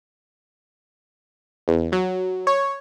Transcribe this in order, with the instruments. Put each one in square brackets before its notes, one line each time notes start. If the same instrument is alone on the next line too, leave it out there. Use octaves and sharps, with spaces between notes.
[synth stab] E2
F#3
C#5